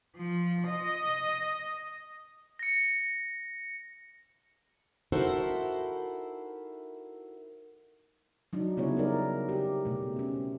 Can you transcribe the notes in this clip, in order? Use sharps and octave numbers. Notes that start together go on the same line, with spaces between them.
F3
D#5
A#6 C#7
D#4 E4 F#4 A4 A#4 C5
F#3 D4 D#4
C#3 G3 B3 E4 G#4 C#5
D#4 E4 A#4 D5
C4 G4
B2 A3
C4 C#4